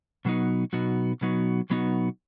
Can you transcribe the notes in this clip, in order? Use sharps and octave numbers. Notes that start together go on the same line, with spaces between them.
B2 F#3 B3 D#4 F#4
B2 F#3 B3 D#4 F#4
B2 F#3 B3 D#4 F#4
B2 F#3 B3 D#4 F#4